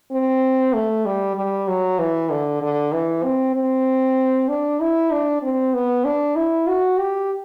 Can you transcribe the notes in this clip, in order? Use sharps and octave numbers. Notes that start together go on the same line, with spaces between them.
C4
A3
G3
G3
F#3
E3
D3
D3
E3
C4
C4
D4
E4
D4
C4
B3
D4
E4
F#4
G4